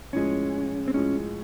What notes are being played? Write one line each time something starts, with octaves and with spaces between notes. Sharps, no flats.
A2 F3 G#3 C#4
C4
A2 F3 G#3 C#4